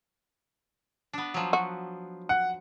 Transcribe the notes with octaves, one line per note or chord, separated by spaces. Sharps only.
B3 D4
F3 F#3
F#4
F#5